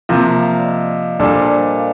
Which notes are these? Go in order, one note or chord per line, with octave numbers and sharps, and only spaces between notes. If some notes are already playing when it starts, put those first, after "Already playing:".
C3 F3 A#3
F5
D5
D#5
D5
A#2 G3 D4 A4 A#4
C5
D5
D#5
F5